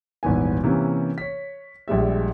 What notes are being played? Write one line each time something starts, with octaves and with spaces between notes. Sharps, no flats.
D#1 G#1 E3 B3 G#5
C3 E3 A#3 C#4
C#5 B6
A#1 G3 G#3 E5